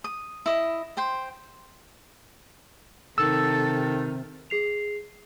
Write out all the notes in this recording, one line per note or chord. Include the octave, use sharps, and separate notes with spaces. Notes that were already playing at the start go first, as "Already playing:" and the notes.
D#6
E4 D#5
C5 G5 C6
C3 D#3 A4 E6
G#4 C7 F7